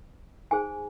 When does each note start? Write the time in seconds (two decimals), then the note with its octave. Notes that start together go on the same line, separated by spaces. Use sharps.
0.51 D#4 G#4 C5 G#5